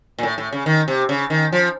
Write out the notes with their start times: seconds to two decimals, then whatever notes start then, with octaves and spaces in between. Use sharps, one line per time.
0.18 A#2
0.23 A2
0.38 A2
0.52 C#3
0.66 D#3
0.88 C3
1.09 C#3
1.30 D#3
1.52 F3